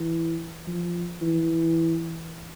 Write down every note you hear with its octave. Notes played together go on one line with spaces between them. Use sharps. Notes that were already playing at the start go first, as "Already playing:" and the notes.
Already playing: E3
F3
E3